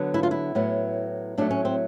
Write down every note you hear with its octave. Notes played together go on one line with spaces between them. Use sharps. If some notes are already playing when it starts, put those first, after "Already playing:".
Already playing: D3 F#3 B3
E4
F4
E4
A2 F#3 B3
A2 F#3 A3 D4
C#4
C4